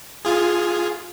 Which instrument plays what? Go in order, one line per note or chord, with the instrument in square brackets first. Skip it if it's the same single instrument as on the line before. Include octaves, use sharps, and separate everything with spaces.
[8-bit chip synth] F4 G#4